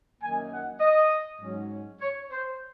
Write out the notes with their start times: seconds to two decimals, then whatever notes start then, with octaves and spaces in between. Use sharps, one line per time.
0.20 F#2 D#3 A#3 D#4 G#5
0.51 F#5
0.80 D#5
1.40 G#2 F#3 C#4
2.01 C#5
2.31 C5